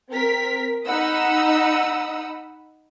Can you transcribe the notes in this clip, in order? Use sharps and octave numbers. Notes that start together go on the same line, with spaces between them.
C4 A#4 B6
D#4 F#5 B5 D#6 E6